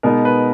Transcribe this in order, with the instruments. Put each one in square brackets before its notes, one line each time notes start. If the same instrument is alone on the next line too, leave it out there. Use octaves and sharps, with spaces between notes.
[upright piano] B2 G#3 B3 D#4 A#4
B4